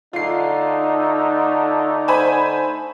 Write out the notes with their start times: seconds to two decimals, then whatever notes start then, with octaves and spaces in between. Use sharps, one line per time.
0.13 D3 A3 D#4 F4 C7
2.08 C5 G#5 B5